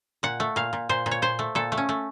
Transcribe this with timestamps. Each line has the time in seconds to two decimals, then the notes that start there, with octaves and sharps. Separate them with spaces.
0.23 A#2 F#5
0.40 A3
0.56 A#2 F5
0.73 A#2
0.89 A#2 C5
1.06 A#2
1.11 C#5
1.22 A#2 C5
1.39 A3
1.55 A#2 A4
1.72 A3
1.77 C#4
1.89 A3